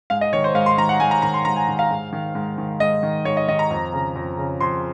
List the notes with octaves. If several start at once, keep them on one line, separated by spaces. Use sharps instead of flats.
G#2 F5
D#5
D#3 C#5
C5
G#2 F5
C6
D#3 A#5
F#5
G#2 G#5
A#5
D#3 A#5
C6
G#2 A#5
G#5
D#3
F5
G#2
D#3
G#2
D#3
G#2 D#5
D#3
G#2 C#5
D#5
D#3 D#5
A#5
F2
C#3
F2
C#3
F2 C6